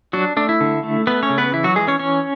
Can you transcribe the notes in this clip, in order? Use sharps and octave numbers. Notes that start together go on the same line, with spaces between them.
F#3 D4 F#4
A3 D4
E4
D3
A3
A3 B3 B4
C#4 C#5
C#3
B3 B4
E3 E4
F#3 F#4
E3 G#3 G#4
C#4 C#5
E3 C#4 C#5